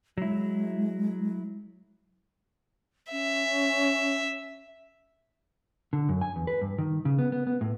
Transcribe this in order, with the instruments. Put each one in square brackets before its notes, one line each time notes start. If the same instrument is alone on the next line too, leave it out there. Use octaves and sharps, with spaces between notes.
[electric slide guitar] F#3 E4 [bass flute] G#3
[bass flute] C#4 [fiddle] E5
[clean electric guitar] D3
F#2
G#5
E2
B4
G2
D#3
C#3
B3
B3
B3
A2